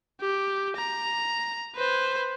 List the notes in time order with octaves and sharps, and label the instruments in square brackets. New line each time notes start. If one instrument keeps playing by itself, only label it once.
[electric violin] G4
A#5
B4 C5